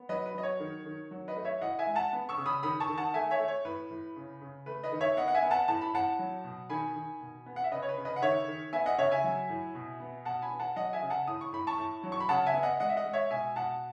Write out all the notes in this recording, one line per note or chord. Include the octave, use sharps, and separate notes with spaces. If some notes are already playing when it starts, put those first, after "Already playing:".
Already playing: B3
F#3 B4 D#5
B4
F#3 D#5
C#5
D#3
D#3
F#3
B4 D#5
A3
C#5 E5
A2 D#5 F#5
E5 G#5
G#3
F#5 A5
B3
C#6 E6
C#3
B5 D#6
D#3 B5 D#6
A5 C#6
D#3
F#5 A5
A3 E5 G#5
C#5 E5
A3
C#5
A2 B4
A2
C#3
C#3
A3 B4
B4 D#5
D#3
C#5 E5
B3 D#5 F#5
F#5
E5 G#5
B3
F#5 A5
A2 A5
B5
A2 F#5 A5
F#3
B2
D#3 G#5 B5
D#3
B2
B3
F#5
E5
C#3 B4 D#5
C#5
B4
C#3
B4 D#5
F#5
D#3 C#5 E5
D#3
B3 E5 G#5
D#5 F#5
C#3 C#5 E5
E5 G#5
F#3
A2
B2
B3
B2 F#5 A5
G#5 B5
B3
F#5 A5
F#3 D#5 F#5
E5 G#5
C#3
F#5 A5
A2 D#6
C#6
A2 B5
A5 C#6
A2
F#3
C#6
B5
C#3 F#5 A5
E5 G#5
B3
D#5 F#5
G#3 D#5 F#5
E5
D#5 F#5
G#3
C#5 E5
B2 E5 G#5
B2 F#5 A5